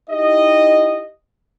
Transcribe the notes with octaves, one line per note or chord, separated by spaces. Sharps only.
D#4 E4 G4 D#5